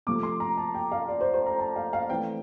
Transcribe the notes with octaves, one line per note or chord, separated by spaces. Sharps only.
C3 F3 A3 D6
C6
A#5
A5
G5
F5
D5
C5
C5
A#5
A5
F5
F5
E3 A3 C4 G5